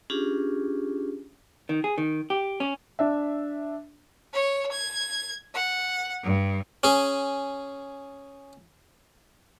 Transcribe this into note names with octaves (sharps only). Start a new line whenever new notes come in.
C#4 D4 F4 G4 G#4
D#3
G#4
D#3
G4
C#4
D4 E5
C#5
G#6
F#5
G2
C#4 G#4